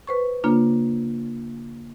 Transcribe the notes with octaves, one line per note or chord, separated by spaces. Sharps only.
B4 C5 C#6
C#3 A#3 D4 F4